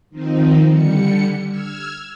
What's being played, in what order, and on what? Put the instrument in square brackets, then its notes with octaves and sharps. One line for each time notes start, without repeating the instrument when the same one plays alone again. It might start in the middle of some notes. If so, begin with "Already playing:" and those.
[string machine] D#3 F3 C4 D#4
D3 G3 C#7
E6 F6 G#6